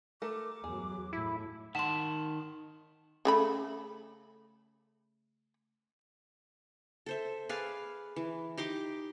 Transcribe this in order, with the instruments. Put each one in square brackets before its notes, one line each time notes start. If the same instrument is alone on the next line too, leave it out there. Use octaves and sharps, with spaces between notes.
[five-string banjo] A3 A4 A#4 [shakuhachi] D6
[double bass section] E2 G2 F#3 [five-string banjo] G#4
[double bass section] A2 [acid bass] E4
[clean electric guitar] D#3 A5 [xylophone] F#5 C6
[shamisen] C#3 A3 B5
[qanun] A4 C5 E5
G#4 B4 D5 F5
E3
D#4 G4 C6 D6